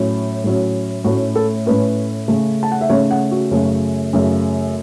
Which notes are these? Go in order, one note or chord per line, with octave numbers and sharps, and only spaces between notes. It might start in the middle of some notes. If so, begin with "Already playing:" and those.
Already playing: A2 F#3 C#4
A2 F#3 C#4
A2 A3 C#4 F#4
A4
A2 A3 C#4 B4
C#3 A3 C#4
A5
F#5
E5
C#3 A3 C#4 C#5
F#5
F#4
F#2 C#3 A3
F#2 C#3 A3